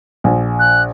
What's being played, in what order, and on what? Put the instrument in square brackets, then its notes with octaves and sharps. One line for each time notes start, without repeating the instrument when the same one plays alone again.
[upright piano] A#1
[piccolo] F#6